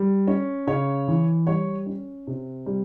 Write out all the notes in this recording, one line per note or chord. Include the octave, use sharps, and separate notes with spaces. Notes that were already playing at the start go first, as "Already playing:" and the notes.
Already playing: G3
C#4
C#3 C#5
E3
G3 C#5
C#4
C3
G3